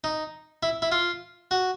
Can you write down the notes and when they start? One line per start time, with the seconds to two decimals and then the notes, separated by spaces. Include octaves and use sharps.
0.04 D#4
0.63 E4
0.82 E4
0.92 F4
1.51 F#4